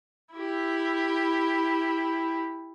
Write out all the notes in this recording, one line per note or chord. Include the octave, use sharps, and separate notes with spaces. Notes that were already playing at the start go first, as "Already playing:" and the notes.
E4 G4